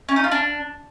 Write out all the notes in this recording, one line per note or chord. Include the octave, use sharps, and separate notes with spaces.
C#4
D#4
F4
D4